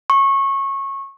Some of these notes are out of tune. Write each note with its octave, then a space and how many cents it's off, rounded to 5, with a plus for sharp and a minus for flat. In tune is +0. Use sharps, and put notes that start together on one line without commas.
C#6 -20